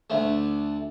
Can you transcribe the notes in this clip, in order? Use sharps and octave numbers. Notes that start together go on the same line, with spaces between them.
D2 A3